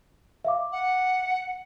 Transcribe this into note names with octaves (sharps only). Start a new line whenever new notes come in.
E5 F5 D6
F#5